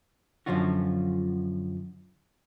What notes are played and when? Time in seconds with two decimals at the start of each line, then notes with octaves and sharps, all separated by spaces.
0.46 F#2 D3 F3 C#4 F4 F#4